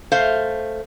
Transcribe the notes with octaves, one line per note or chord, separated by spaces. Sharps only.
A3 C5 F5